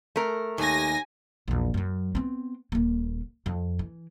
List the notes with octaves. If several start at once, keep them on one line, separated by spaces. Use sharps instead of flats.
A3 A#4
D#2 G#5 A#6
A#1 E2
F#2 F#3
B3 C4
D#1 A#3
F2
E3